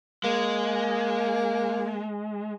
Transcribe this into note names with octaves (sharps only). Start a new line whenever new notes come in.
G#3 A#3